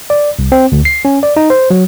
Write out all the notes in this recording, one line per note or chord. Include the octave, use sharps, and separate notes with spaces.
D5
C2
C4
D2
C7
C#4
D5
D#4
C5
F#3